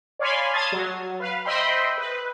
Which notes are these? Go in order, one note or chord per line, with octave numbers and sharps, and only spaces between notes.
C#5 D5 F5 G#5 B5 C6
A5 C6 D#6 F6 G#6 A6
F#3
B4 F5
C5 D#5 E5 G5 B5 C6
B4